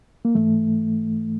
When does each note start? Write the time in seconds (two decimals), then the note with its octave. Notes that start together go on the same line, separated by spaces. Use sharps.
0.25 A#3
0.35 G#2 E3 A3